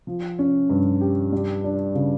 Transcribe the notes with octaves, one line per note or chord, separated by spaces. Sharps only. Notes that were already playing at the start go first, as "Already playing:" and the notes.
F3
C#4
G2
G4
G3
D4
C#3